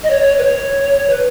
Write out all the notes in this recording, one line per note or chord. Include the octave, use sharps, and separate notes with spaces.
D#5
C#5
C#5
B4
C#5
B4